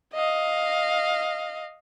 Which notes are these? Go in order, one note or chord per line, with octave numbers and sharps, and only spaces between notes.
D#5 F5